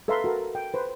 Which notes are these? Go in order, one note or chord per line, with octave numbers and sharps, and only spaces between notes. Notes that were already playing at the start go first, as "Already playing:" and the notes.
A4 B4 E5 F5 A#5 C6
F#4 A4 A#4
G5
B4 C5